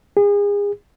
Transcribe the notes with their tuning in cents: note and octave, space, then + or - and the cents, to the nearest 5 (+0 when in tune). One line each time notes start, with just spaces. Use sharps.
G#4 -35